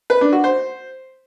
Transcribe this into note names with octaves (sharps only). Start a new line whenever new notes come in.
B4
D4
F#4
C5